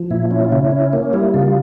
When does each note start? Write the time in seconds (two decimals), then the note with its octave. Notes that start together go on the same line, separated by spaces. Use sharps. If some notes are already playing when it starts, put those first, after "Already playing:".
Already playing: F3
0.11 A#2 E4
0.31 C#4 E4
0.45 F4
0.52 C#3 E4
0.72 C#4
0.93 A#3
1.13 G3 E4
1.34 C#3 F4
1.47 F4